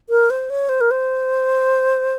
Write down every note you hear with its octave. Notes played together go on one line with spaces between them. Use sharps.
A#4
C5
C#5
C5
A#4
C5